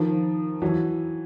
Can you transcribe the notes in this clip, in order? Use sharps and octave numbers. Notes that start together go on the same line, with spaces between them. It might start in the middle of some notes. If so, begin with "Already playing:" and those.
Already playing: D#3 F3
E3 F#3